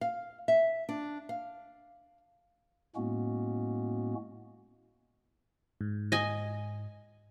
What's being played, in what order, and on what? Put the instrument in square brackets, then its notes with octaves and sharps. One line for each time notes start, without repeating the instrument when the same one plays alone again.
[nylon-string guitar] F5
E5
D4
F5
[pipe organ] A2 G#3 A#3 B3 C#4 F#4
[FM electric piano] G#2
[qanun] D#5 G#5